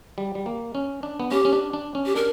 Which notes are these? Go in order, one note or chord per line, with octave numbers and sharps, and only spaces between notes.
G3
G3
A#3
C#4
D4
B3
C#4 G4
C#4
D4
D4
C#4
G4
D4 A#4